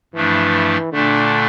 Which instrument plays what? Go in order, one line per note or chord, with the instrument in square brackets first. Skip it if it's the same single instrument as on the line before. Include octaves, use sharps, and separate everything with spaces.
[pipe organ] G2 F3 A3 D4 [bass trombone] E3
[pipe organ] A#2 A3 D4 [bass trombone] D3